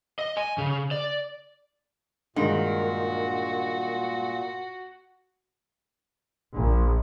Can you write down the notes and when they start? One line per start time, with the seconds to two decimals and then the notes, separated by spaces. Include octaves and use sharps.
0.19 D#5
0.37 G#5
0.58 C#3
0.91 D5
2.36 G2 A#2 D#3 G#3 F#4
6.56 A#1